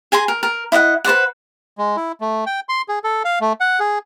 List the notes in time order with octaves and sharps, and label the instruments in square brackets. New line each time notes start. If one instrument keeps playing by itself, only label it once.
[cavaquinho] G#4 G#5 A#5 C6
A#4
A#4
E4 D#5 F5 F#5
B4 C5 D5 F#5
[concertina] G#3
E4
A3
G5
C6
G#4
A4
F5
A3
F#5
G#4